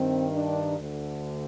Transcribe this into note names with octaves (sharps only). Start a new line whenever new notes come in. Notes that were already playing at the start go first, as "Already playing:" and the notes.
Already playing: G2 D#3 C4
D4
D2 D3